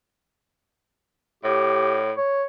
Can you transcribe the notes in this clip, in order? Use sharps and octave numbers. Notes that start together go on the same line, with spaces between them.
A2 G4
C#5